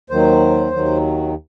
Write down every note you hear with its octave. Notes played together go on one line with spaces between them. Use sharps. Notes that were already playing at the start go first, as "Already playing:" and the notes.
D#2 D#3 F#3 C5
D#2 D#3 F#3